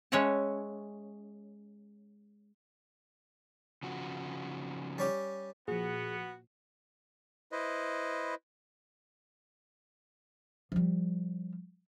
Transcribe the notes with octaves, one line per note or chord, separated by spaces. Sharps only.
G#3 C#4 C#5 E5 F#5 A5
C#3 F3 F#4
G3 C#4 G4
A#2 F3 B3 F#4 G#4
E4 B4 C5 D#5
F3 G3